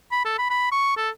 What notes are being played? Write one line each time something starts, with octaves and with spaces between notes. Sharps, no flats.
B5
A4
B5
B5
C#6
A4